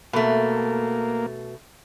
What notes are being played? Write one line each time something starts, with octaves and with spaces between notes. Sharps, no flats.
B2 A3 A#3